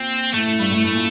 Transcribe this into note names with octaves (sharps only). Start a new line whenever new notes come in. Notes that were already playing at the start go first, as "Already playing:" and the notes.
Already playing: A#2 C4
A2 A3
A2
G2
A2
A2
A#2